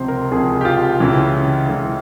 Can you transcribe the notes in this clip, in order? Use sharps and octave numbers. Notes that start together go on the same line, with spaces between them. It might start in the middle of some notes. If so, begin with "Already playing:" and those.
Already playing: C#2 C3 F3 C5
A#4
C#2 C3 F3 G#4
G4
F4
C#2 C#3 E3
C#2 C#3 E3